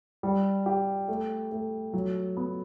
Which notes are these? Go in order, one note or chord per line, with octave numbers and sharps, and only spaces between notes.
G3
G4
A3
A3
F#3
B3